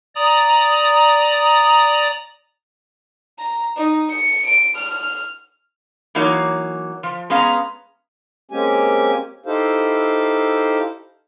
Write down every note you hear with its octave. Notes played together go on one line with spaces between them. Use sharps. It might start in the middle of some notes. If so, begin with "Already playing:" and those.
D5 A#5 D#6
A#5
D#4
C#7
D7
F6
E3 F#3 A#3 D#4 C#5
F3
G#3 B3 C#4 F5 A#5
G#3 A#3 C4 C#4 G4 G#5
D#4 E4 G4 A4 C5 F5